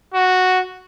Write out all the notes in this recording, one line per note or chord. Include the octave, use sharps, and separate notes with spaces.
F#4